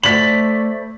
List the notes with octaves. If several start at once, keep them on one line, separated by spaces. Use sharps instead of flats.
A3 C5 D5 B5 B6 F#7